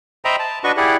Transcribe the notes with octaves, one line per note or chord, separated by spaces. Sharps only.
C5 D#5 E5 G5 A#5 B5
A5
D4 F#4 B4 D#5 C#6
E4 G4 G#4 D5 F#5